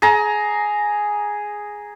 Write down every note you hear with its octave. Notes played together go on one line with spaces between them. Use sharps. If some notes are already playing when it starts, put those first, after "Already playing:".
G#4 A#5